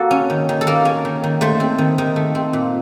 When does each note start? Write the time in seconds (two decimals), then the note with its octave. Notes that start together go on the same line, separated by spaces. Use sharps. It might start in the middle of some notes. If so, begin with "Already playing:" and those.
Already playing: A#3 F#4 A4
0.11 C#4
0.30 D#3
0.49 D#3
0.61 A4
0.67 A#3 A#4
0.85 C#4
1.05 D#3
1.24 D#3
1.41 A3 C5
1.60 C4
1.78 D#3
1.98 D#3
2.16 A3
2.35 C4
2.53 A#2